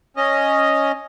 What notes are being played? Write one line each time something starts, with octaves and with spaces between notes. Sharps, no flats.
C#4 D#5